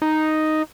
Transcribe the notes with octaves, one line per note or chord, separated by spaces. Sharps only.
D#4